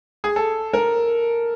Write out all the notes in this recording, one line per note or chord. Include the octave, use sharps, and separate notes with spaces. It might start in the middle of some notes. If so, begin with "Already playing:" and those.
G#4
A4
A#4